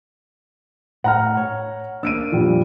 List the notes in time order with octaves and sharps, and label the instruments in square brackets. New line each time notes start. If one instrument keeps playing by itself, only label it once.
[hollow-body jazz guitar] A2 [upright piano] F#5 A#5 F6
[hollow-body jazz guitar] C#5
[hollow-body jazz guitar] A#3 D4 [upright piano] E6 D7 D#7
[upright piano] F2 A#2 G3